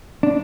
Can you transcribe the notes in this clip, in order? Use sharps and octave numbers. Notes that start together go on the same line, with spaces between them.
D4